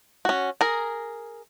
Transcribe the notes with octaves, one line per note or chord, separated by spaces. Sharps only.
C#4 F#4
G#4 A#4